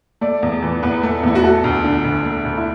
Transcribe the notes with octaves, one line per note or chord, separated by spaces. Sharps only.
A3 D5
E2
E3
E2 B4
A3
E2 E4
F#4
A3 A4
D2
D3
D2
A3
D2
E4